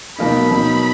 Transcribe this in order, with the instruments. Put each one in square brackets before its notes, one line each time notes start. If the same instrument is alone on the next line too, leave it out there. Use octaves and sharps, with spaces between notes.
[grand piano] B2 F#3 A#3 D#4 [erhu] B5
[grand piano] B2 F#3 A#3 D#4